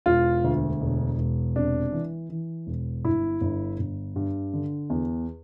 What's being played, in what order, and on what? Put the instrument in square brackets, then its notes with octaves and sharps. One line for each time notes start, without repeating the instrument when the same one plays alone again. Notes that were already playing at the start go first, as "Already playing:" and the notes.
[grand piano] E1 F4
D2
E1
E1
C3 D4
E3
E3
E1
G1 E4
G1
G1
G2
D3
E2